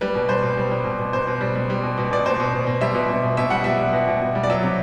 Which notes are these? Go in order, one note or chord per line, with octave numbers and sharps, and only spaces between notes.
G3 B4
B2
G3 C5
B2
G3
G3
B2
B2
B2 C5
B2
G3
G3
G3
B2
B2
B2 D5
B2 C5
B2
B2
B2
G3 E5
B2
B2
B2
B2 E5
G3 F#5
G3 E5
G3
B2
B2
B2
G3
D5
F#3 E5
C3